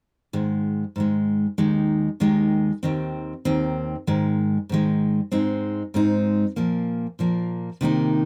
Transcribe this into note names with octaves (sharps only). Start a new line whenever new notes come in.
G#2 D#3 G#3
G#2 D#3 G#3
D#2 D#3 G#3 D#4
D#2 D#3 G#3 D#4
D#2 D#3 C4
D#2 D#3 C4
G#2 D#3 G#3
G#2 D#3 G#3
G#2 G#3 C4 D#4
G#2 G#3 C4 D#4
A#2 F3 A#3
A#2 F3 A#3
C3 D#3 A#3 D#4